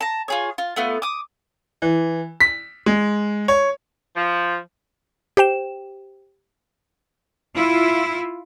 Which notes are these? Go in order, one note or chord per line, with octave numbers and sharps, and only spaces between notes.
A5 A#5
F4 G#4 C#5
F4
A3 B3 F4
D6 D#6
E3
B6
G#3
C#5
F3
G4 C5 G5 E7
E4 F4